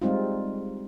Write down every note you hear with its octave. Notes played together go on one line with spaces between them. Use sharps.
G3 G#3 C4 D#4 F4